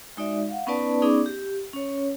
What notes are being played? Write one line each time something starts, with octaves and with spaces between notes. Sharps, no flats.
G#3 D#4 F#4 D5 E5
F5 F#5
B3 C#4 D#4 B4 D5 A5
B3 C#4 D#4 G#4 D5 D6
G4
C#4 C#5